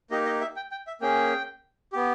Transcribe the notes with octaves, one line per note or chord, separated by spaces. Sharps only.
A#3 D#4 G4 D#5
D#5
E5
G5
G5
E5
A#3 C#4 G#4 G5
B3 G4